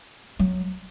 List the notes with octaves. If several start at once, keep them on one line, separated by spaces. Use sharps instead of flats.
F#3